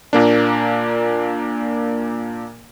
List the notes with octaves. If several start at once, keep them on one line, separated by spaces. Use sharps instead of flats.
A#2 A#3 D4